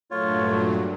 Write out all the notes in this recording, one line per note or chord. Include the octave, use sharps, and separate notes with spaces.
G2 A#2 F#3 A3 F4 C#5